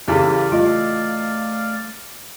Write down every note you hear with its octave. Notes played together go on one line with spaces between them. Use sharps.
E2 C#3 E3 G4 A4 B4 D5 F5
A3 F4 D#5